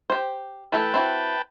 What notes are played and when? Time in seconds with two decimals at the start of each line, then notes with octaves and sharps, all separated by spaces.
0.10 G4 C5
0.72 E3 A3 A4 B4 G5 A5
0.94 C4 E4 F#4